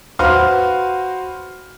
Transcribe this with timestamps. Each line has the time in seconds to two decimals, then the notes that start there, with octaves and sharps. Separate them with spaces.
0.19 F#4 B4 C5 F5 C6 F6